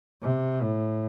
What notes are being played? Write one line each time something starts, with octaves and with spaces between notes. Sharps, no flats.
C3
A2